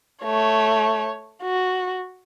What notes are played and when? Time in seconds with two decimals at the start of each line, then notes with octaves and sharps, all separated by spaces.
0.24 A3 C#5
1.43 F#4